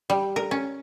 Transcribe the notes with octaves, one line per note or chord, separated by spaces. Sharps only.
G3
A#4
C#4